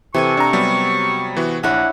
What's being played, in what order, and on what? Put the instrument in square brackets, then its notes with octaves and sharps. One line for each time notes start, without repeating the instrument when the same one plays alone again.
[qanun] C3 A4 G#5 [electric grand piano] E3 [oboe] C#6
[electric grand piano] D4 A#5
F#3 G3 B3
E3 B3 F#4
[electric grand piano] A#1 [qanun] D4 E4 C#5 [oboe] F#5